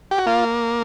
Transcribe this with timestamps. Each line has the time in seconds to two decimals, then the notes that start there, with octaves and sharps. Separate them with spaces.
0.11 G4
0.18 F#4
0.26 A#3 F4